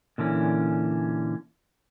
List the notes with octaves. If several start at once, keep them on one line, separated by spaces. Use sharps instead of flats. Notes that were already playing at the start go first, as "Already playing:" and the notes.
A#2 D3 E3 C#4